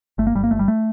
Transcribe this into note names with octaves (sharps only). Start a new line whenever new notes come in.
G1 A3
A#3
G1 G3
A#3
G1 A3
G3
A3